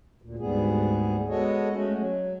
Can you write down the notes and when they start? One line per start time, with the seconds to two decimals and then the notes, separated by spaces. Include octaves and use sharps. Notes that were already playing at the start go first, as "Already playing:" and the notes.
0.22 D2 A#2
0.39 D2 G#2 G3 B3 G#4
1.29 G#3 B3 F#4 A4 C#5 D#5
1.71 G#3 A3 C#4 F#4
1.96 F#3